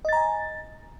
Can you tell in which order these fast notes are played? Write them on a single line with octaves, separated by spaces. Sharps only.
D#5 A6 A#5 G#5